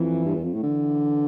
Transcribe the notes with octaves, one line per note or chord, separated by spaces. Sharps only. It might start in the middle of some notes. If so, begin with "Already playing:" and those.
Already playing: F2 E3
G2
E2
F2
A2
D3 E3